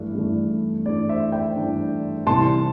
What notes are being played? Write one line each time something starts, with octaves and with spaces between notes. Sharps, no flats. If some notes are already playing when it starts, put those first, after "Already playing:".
Already playing: G2 E3 A3
G2 E3 A3 D4
G2 E3 A3 D4 D5
C5 E5
E5 G5
G2 E3 A3 D4
C2 C3 E3 A5 C6